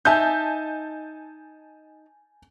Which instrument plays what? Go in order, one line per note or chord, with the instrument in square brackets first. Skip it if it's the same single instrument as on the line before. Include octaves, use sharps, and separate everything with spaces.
[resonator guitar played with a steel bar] D#4 E5 [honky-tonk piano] G#5 A5 G6